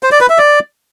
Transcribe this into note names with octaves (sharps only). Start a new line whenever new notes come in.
C5
D5
B4
E5
D5